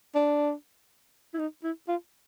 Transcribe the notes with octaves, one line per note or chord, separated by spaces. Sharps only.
D4
E4
D#4
E4
F4